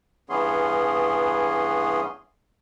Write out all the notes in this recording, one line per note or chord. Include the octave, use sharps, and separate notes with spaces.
G2 E3 B3 C#4 G#4 C6